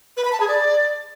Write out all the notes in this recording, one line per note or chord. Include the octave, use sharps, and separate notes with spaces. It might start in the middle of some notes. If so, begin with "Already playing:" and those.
B4
B5
A5
G#4
D5